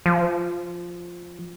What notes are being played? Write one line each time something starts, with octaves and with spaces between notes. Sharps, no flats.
F3